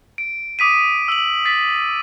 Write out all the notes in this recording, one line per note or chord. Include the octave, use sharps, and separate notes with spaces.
D7
D6 D#6 B6 D#7
E6 F#7
A6 B6